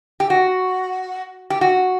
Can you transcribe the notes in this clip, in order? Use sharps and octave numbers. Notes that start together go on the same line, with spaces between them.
G4
F#4
G4
F#4